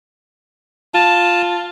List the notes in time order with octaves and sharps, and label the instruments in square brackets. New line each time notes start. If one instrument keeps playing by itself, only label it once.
[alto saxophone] F4 [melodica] A5